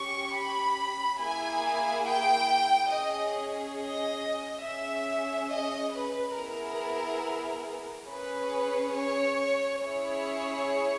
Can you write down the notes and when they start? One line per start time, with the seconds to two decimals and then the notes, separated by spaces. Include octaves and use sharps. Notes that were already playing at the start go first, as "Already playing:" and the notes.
Already playing: C#4 G4 C#6
0.34 B5
1.19 A#3 E4 G#4 G#5
2.05 G5
2.92 C#4 G#4 D#5
3.78 D#5
4.64 C#4 G#4 E5
5.50 D#5
5.93 B4
6.36 B3 E4 G#4 A#4
8.08 C#4 G#4 B4
8.94 C#5
9.80 C#4 E4 G#4 C#5